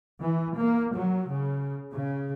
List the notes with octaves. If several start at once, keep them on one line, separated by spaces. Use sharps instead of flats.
E3
A#3
F#3
C#3
C#3